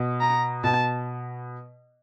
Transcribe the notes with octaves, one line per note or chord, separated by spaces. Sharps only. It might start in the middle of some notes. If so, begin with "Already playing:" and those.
Already playing: B2
A#5
B2 A5